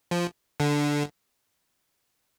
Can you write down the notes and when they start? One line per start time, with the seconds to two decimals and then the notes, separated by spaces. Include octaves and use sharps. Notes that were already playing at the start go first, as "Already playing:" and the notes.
0.11 F3
0.60 D3